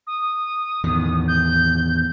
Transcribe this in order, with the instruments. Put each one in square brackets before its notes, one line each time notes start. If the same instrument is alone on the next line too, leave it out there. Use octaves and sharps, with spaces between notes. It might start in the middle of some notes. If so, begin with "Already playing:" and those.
[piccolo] D#6
[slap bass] E2 A2 D#3
[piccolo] G6